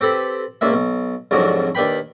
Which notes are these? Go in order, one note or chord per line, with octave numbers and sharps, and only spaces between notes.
C4 G4 A4 B4
C#2 A#2 A#3 E5
B1
C2 F2 G#2 F#3 D4
D#2 D4 B4 G5 B5